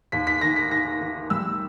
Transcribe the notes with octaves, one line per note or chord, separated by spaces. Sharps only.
D#2 B6
B6
D#3 A#6
B6
D#3 A#6
D#3
G3 E6